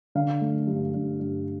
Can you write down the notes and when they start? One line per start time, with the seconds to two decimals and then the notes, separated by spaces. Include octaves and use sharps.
0.15 D3 F5
0.41 A3
0.67 G2
0.94 G2
1.20 G2